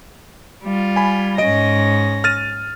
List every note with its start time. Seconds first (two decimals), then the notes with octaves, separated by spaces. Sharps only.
0.63 G3 F4
0.96 G#5 B5
1.38 G#2 C#4 D#5 A#6 D7
2.24 F6 A6 D#7